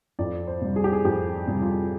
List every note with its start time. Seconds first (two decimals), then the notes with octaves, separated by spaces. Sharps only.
0.19 F2 D5
0.47 C5
0.61 C3 G3
0.76 G#4
0.84 G4
0.92 G#4
1.05 F2 G4
1.48 C3 G3
1.62 F4